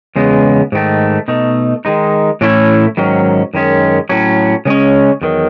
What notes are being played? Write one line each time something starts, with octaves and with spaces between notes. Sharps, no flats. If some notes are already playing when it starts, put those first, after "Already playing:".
E2 C#3 G#3 B3
G#2 D#3 A3
B2 A3 D#4
D#3 G#3 D#4
A2 E3 A3 C#4 E4
G#2 D#3 F#3 C#4
F#2 D#3 G#3 C#4
A2 F#3 C#4
C#3 G#3 C#4
E2 D#3 F#3